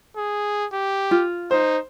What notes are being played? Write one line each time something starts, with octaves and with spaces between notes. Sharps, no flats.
G#4
G4
F4
D#4 C5